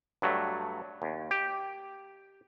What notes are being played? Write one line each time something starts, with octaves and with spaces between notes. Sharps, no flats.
G2 F#3 A3
D#2
G4